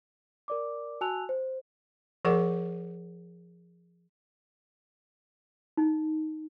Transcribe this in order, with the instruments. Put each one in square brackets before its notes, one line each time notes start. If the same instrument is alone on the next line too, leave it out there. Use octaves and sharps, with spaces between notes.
[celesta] A#4 D5 D6
F#4 G#5 A5 E6 F#6 F7
C5
[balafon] F3 G#4 A#4 D5 F#5 D6
[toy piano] D#4